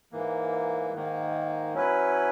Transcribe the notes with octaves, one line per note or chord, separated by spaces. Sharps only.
G#2 E3 A#3
G#2 D#3 A#3
F#3 C#4 E4 B4